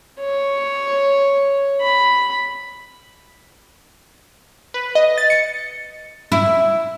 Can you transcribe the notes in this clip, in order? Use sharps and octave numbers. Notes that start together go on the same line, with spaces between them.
C#5
B5
B4
D#5
A6
C#7
E4